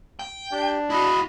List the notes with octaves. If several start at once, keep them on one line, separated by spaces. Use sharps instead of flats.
G5
D4 G4
E4 F#4 D#5 B5